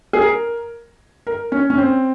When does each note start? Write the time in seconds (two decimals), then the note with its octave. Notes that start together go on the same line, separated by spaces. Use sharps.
0.13 G#4
0.23 A#4
1.27 A#4
1.52 C#4
1.70 C#4
1.78 C4